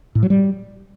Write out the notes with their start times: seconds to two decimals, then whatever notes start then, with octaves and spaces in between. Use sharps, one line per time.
0.15 A2
0.23 F#3
0.30 G3